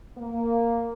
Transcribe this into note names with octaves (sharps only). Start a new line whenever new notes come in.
A#3